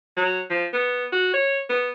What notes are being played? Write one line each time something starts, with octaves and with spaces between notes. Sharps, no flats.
F#3
F3
B3
F#4
C#5
B3